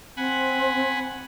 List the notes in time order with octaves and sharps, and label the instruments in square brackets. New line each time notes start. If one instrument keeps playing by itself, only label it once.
[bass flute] C4 [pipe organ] F#5 G#5 B5